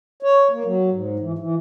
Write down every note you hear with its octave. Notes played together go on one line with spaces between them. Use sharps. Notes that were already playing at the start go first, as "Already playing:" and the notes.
C#5
A#3
F#3
G#2
E3
E3